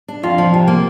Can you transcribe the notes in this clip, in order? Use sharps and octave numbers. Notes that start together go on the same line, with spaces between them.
D4
F2 F4
F3
C3
A#3